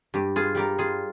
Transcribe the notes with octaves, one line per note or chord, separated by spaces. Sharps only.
G2 G4
F4 G#4
G3 G4 A#4
F4 G#4